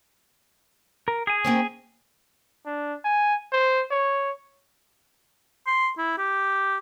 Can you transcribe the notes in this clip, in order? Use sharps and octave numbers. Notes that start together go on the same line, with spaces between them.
A#4
G#4 G#5
A#3 C4 C#4
D4
G#5
C5
C#5
C6
E4
G4